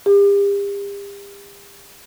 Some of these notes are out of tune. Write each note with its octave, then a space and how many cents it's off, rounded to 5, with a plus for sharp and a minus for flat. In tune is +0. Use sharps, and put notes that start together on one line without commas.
G4 +40